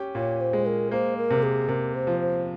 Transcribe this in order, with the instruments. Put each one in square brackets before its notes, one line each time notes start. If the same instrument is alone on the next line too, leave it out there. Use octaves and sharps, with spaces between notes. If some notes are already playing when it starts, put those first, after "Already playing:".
Already playing: [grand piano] C#4 G4
[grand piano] A#2 [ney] C#5
[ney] C5
[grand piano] G#3
[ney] A#4
[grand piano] A#3 [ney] C5
[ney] A#4
[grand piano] C3
[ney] G#4
[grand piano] C3 [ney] A#4
[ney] C5
[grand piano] F3
[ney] C5